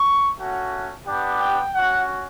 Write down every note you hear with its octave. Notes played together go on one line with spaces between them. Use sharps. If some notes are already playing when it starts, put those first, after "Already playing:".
Already playing: C#6
A3 C#4 F#4
B3 D4 G4
G5
C#4 F#4 F#5